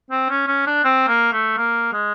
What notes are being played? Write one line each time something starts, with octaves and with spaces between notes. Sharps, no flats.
C4
C#4
C#4
D4
C4
A#3
A3
A#3
G#3